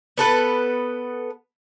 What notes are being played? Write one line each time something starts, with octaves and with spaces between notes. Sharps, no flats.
B3 A4 B4